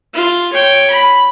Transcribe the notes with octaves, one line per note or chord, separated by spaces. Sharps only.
F4
C#5 G5
B5